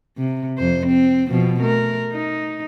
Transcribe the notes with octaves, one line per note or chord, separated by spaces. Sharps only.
C3
F2 C5
C4
B2 F3 C4
A3 A#4
D#4